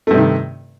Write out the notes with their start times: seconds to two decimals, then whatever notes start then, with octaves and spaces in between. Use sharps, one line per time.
0.07 A3
0.11 G2
0.14 C3
0.18 D#3